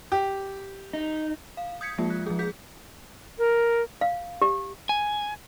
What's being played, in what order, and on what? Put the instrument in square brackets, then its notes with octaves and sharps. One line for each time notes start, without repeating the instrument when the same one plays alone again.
[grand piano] G4
[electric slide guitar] D#4
[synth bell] F5
D#6 G6 G#6 B6 C#7
F3 G#3 A#3 F4
F#6
F3 G#4
G#4 G6 B6
[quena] A#4
[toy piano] F5
G4
[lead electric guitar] G#5